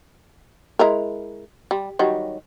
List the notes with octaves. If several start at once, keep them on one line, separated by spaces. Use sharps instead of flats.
G#3 E4 A#4
G3
D#3 F#3 G3